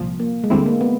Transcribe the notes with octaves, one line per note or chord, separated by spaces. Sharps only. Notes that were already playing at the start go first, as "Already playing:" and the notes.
Already playing: C2 A#2 F3
A#3
G#3
D2 D3 G3 A3 C4 E4
A#3
B3